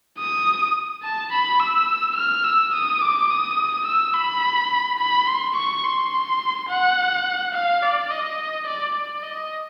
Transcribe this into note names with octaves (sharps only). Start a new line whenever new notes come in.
D#6
A5
B5
E6
F6
E6
D#6
D6
D#6
E6
B5
B5
C6
C#6
C6
F#5
F5
D5
D#5
D5
D5
D#5